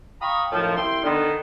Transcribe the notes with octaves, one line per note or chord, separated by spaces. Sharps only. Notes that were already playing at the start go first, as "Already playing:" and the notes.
F5 G5 A#5 B5 C#6 D#6
F#2 A2 D#3 F3
C2 E4 G5 C6
D3 D#3 B3